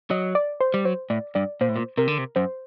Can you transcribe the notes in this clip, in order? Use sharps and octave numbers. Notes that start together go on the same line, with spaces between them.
F#3 D#5
D5
C5
G3
F#3 C5
A2 D5
G2 D5
A#2 C5
A2
A#2
C3 A#4
D3
C3
F#2 C5